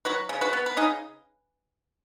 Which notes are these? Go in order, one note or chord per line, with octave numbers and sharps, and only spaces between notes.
F#3 F#4 B4
C#3
F#4 B4
B3
B4
C#3 D#4 G#4